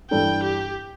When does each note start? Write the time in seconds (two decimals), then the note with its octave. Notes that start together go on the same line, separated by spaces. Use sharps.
0.10 G2 E3 G3 D4 A4 G5
0.43 G4